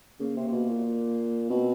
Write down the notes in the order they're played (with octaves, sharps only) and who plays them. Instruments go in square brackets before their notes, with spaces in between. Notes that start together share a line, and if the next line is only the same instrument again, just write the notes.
[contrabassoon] C#3 [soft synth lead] A#3
[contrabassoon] C3
C3
B2
A#2
[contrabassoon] B2 [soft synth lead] C4